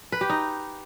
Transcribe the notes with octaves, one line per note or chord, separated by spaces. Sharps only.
B4
G4
D#4